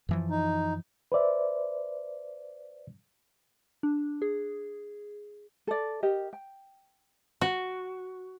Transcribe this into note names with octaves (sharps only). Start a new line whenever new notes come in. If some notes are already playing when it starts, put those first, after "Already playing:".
F#2 E3 F3
D#4
B4 C5 D5 E5
D4
G#4
A4 D5
G4 A#4 D#5
G5
F#4